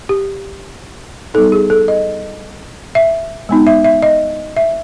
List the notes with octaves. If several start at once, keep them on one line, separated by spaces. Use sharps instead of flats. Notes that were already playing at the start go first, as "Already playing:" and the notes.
G4
G3 B3 D#4 A4
G#4
A4
D#5
E5
G#3 B3 D#4
E5
E5
D#5
E5